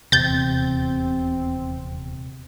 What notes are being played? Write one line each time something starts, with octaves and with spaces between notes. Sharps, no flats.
D#1 E2 C3 C4 G6 A6